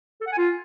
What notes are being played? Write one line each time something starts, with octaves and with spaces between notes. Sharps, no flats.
A4
F#5
G#5
F4